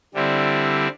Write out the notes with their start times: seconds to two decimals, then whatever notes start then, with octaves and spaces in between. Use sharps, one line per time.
0.14 D3 G3 C4 E4